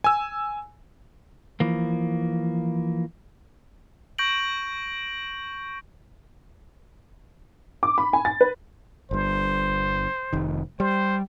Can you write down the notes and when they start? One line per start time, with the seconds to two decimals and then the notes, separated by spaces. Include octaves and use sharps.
0.04 G#5 E6
1.60 E3 F3 A#3
4.18 C#6 G6 A#6 D7 F#7
7.83 D6
7.98 B5
8.13 G#5
8.25 A6
8.41 B4
9.11 G1 G2 C5
10.33 F1 D#3
10.80 G3 C5